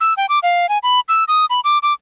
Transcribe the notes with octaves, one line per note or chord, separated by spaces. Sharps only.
E6
G5
D6
F5
G#5
B5
E6
D#6
B5
D6
D6